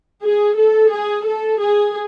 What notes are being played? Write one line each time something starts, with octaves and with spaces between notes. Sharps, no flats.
G#4
A4
G#4
A4
G#4